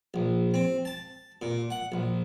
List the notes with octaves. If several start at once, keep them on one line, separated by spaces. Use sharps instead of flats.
A#1
C4
A5
A#2
F#5
A#1